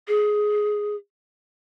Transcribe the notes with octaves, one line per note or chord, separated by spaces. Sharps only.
G#4